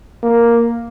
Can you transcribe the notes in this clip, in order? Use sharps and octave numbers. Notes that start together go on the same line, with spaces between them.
A#3